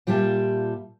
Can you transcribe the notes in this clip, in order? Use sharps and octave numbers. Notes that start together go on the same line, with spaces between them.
A#2 G3 F4 G4 E5 A5